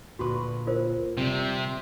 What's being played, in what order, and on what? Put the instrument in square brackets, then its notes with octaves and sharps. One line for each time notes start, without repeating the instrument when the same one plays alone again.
[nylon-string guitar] D2 A#2 B4 [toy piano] F#4 B5 C#6
[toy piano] F4 A#4 C5
[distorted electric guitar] C3 [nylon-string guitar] G3 C4